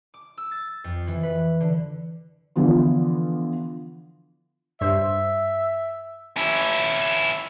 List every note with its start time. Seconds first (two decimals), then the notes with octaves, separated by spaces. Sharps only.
0.14 D6
0.37 E6
0.51 A6
0.84 F2
1.07 E3
1.23 B4
1.60 D3
2.56 D3 E3 F3 B3 F4
4.81 G2 C5 E5
6.37 C#4 E4